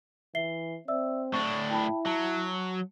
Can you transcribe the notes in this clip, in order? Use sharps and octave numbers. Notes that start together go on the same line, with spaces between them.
E3 E5 C7 G7
C4 D5 E5 E6
A2 D4 C#6
E4 G5 A5 B5
F#3 A5